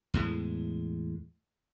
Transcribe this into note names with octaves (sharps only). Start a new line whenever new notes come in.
E2 A2 G#3